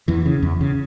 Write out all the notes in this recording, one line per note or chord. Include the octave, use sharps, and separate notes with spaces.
E2 E3
C#3
E2
C#3